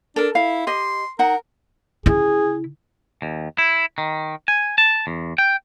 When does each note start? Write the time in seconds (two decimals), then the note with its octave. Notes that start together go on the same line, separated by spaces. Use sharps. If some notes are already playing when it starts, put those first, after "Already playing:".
0.16 D4 A4 A#4
0.35 E4 F5
0.67 G4 D#5 C6
1.19 D#4 A#4 F#5
2.06 C#3 E4 G#4
3.22 D#2
3.58 E4
3.98 D#3
4.48 G#5
4.78 A5
5.07 E2
5.38 G5